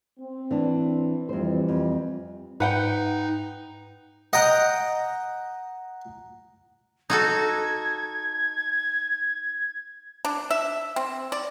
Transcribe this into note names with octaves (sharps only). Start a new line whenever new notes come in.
C4
E3 D4
F2 E3 G3 C5
F2
G#2 D#4 B4 F#5 G5
D#5 F#5 G5 A#5 F#6
D#4 F#4 A4 G#6
D4
E5
C4
D5